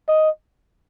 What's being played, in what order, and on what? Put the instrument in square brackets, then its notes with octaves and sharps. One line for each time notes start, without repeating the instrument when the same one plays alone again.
[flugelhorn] D#5